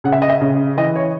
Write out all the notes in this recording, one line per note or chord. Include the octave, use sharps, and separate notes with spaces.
C#3 F#5
E5
D#5
E5
C#3
E3 D#5
C#5